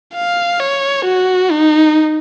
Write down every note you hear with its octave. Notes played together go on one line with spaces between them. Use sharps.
F5
C#5
F#4
D#4